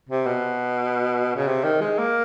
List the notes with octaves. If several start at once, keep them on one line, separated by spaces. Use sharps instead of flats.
C3
B2
C#3
C3
D#3
G#3
A#3